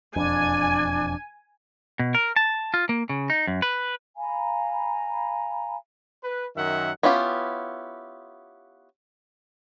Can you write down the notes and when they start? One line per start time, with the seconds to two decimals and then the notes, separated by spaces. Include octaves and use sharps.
0.16 E1 F2 D4 G#5
1.99 B2
2.15 A#4
2.36 A5
2.74 F4
2.89 A#3
3.09 C#3
3.30 D#4
3.47 F#2
3.62 B4
4.17 F5 G#5 A#5 B5
6.24 B4
6.56 F#2 D#3 E5 F#5
7.03 B3 C#4 E4 F4 G4